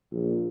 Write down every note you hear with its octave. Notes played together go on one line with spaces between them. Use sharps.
A#1